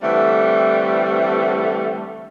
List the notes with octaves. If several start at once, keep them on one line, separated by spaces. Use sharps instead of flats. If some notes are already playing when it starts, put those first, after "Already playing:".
D3 E3 G3 A3 C4